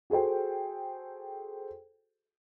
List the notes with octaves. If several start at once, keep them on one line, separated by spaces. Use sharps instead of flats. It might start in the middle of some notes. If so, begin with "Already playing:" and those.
F#4 G#4 A4 C5 G5